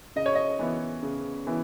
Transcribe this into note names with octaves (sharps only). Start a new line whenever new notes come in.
C#3 D#5
C#5
D#5
E3 B3 E4
C#3
E3 B3 E4